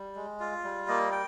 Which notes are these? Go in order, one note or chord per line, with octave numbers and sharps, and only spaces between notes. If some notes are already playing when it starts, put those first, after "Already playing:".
Already playing: G3
G#3
F4
G3
A#3 D#5
G5